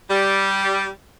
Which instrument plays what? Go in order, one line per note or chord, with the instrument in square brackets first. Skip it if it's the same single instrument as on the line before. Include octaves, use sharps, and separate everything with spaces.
[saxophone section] G3